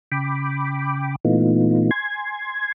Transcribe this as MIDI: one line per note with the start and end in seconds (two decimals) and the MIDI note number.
0.12 1.16 49
0.12 1.16 79
0.12 1.16 83
0.12 1.16 86
1.25 1.91 46
1.25 1.91 52
1.25 1.91 57
1.25 1.91 59
1.25 1.91 63
1.25 1.91 65
1.91 2.72 80
1.91 2.72 84
1.91 2.72 92